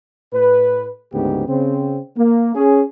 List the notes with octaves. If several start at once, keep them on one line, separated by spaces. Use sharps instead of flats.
A2 B4
D2 G#2 C#3 B3 G4
C#3 C4
A#3
C#4 G#4